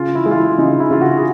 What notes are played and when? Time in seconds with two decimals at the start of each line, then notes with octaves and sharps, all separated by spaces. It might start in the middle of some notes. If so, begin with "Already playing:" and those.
Already playing: C#3 F4
0.15 E4
0.26 G#3
0.31 F4
0.36 E4
0.58 C#3 D#4
0.80 E4
0.91 C#3 F4
1.01 F#4
1.17 G#4